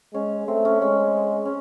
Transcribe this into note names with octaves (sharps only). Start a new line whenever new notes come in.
G#3 C#4
A3 C4
C#4
G#3 C#4
C#4